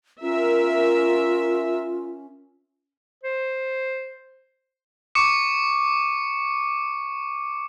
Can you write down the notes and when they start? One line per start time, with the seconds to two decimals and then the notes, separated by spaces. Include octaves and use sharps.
0.22 C#4 F4 A#4 E5
3.23 C5
5.15 C#6 D6 C#7